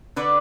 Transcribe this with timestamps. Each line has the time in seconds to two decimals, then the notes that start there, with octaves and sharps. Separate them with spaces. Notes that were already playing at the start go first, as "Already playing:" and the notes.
0.16 D3 B4 D5